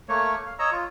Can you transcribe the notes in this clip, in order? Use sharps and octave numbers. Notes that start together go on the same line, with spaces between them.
A3 A#3 C#5
F5
C#5 D#5 A#5 E6
F4